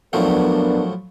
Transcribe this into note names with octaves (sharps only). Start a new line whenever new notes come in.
A2 F3 F#3 B3 D4 A#4